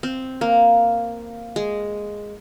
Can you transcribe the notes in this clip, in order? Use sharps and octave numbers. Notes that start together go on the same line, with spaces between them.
C4
A#3
G#3